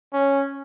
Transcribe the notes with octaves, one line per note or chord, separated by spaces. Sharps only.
C#4